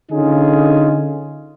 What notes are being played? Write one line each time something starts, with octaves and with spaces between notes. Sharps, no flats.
D3 C#4 D#4 F4 G#4